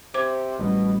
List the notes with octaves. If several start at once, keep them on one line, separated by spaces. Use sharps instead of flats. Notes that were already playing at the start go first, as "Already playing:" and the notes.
C3 C5 D6
A1 B2 F#3 G3